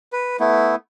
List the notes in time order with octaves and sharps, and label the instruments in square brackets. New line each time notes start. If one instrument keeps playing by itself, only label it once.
[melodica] B4
A3 B3 E4